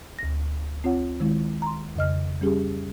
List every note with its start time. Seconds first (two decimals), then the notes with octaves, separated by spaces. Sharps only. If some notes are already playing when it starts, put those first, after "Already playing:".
0.19 D2 A#6
0.84 C4 F4 C#5 F#5
1.20 D#3 G#3 E4
1.62 A#5 C6
1.96 F2 C#3 D#5 F6
2.41 G3 C#4 G4 G#4